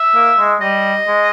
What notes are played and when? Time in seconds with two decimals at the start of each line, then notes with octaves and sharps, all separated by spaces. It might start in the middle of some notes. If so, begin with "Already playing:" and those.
Already playing: E5
0.15 A#3
0.39 G#3
0.61 G3 D#5
1.08 G#3